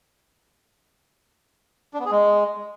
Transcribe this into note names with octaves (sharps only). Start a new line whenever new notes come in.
D4
B3
G#4
G#3